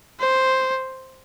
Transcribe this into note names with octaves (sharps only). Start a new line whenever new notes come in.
C5